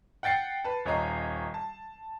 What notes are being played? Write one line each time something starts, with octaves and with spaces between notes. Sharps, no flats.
F#5 G5 A6 C7 C#7
B4 A5
D#1 C#5 D#5 A#5 C7
A5